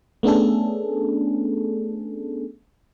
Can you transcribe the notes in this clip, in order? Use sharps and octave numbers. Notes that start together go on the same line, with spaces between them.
A3 B3 C#4 D4 G#4 A4